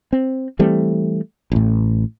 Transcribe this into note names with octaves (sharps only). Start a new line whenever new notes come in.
C4
E3 G3 A3 C4
A1 A2